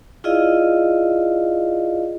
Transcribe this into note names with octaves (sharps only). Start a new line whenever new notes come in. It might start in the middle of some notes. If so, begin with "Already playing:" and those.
E4 F4 G#4 D5 D#5 F5